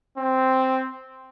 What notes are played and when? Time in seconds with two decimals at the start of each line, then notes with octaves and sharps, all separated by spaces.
0.17 C4